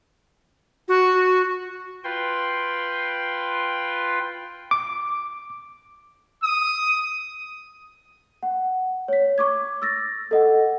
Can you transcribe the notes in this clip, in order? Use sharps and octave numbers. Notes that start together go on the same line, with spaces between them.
F#4
F4 B4 G5 C6
D6
D#6
F#5
C#5 B6
C#6 D6 G#6
E6 A6 A#6
A4 D#5 F#5